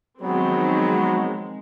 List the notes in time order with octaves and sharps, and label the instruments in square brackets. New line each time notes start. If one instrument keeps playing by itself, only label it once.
[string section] D#3 F3 C4 [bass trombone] F#3 [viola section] G#3 [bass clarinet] B3